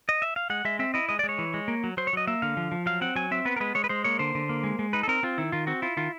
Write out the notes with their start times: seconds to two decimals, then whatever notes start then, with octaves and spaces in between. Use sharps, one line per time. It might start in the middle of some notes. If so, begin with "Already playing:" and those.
0.09 D#5
0.22 E5
0.36 F5
0.50 G#3 F#5
0.65 G#3 E5
0.79 C4 E5
0.94 E4 D#5
1.09 G#3 D#5
1.19 D5
1.24 G#3
1.29 C#5
1.39 E3
1.54 G#3
1.68 A#3
1.84 F#3
1.97 F#3 C5
2.07 C#5
2.13 F#3 D#5
2.27 A#3 E5
2.42 D3 F5
2.57 F3
2.72 F3
2.86 F#3 F5
3.01 C4 F#5
3.15 F#3 G#5
3.31 C4 E5
3.45 B3 B4
3.56 A#4
3.60 G#3 B4
3.75 G#3 C#5
3.84 B4
3.89 G#3 C5
4.04 A#3 C#5
4.19 D3 C5
4.35 D3
4.49 A#3
4.64 G#3
4.79 G#3
4.93 D#4 B4
5.03 A4
5.08 C4 A#4
5.23 C4 F4
5.38 D#3 E4
5.52 D#3 F4
5.67 C4 F#4
5.82 E4 F4
5.97 D#3 F4